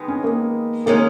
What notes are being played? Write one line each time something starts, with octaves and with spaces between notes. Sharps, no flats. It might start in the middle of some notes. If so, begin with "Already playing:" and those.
Already playing: D#3 G#3 B3 D#4
C#4
A#3
D#3 G#3 A#3 C#4